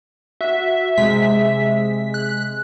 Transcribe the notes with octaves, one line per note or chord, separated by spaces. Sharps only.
F#4 E5
C3 G#3 B6
F#6